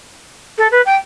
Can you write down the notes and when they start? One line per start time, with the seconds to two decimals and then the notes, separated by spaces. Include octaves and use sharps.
0.57 A4
0.71 B4
0.85 G5